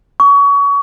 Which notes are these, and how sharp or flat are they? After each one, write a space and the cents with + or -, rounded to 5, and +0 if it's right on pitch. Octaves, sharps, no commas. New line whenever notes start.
C#6 +30